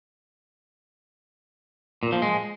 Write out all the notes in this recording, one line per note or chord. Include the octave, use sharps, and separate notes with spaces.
A#2
F3
G#3